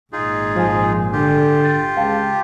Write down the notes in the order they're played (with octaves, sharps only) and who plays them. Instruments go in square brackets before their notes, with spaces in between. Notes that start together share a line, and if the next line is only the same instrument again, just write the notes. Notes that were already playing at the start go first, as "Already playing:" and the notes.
[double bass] G#1 A#2 [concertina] D#4 F4 G#4
[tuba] F3 [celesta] F5 G#5
[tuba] D3 [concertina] F4 G4
[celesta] A6
[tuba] C#2 [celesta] F5 G5 A5